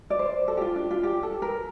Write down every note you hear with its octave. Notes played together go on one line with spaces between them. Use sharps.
D5
C5
A4
G4
F4
D4
F4
G4
A4
A#4